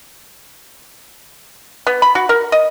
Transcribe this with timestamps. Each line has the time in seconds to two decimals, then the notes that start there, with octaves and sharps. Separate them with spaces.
1.86 B3
2.02 B5
2.15 F#4
2.29 A#4
2.52 D#5